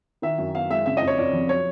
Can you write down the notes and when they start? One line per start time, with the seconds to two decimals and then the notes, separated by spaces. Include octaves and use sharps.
0.22 D#3 E5
0.38 F#2
0.54 B3 F5
0.70 G#3 E5
0.86 C#3 E5
0.97 F2 D#5
1.07 C#5
1.18 F2 D5
1.33 F3
1.49 F#3 C#5